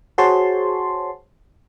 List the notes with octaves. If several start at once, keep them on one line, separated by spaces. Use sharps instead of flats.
F#4 G#4 C5 C#5 A5 C6